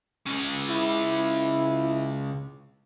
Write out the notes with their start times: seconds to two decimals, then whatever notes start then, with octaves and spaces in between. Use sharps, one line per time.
0.26 C#3 G#3
0.70 E4